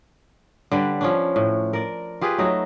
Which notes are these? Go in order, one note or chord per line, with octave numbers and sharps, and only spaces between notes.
D3 G3 B4
F3 C#4 D4
A2
A#4 D5
F4 G4 G#4 B4
F#3 A3 D#4